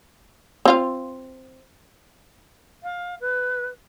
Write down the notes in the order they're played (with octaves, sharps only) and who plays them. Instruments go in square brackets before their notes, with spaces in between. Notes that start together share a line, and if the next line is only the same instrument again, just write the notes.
[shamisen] C4 F4 F5
[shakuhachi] F5
B4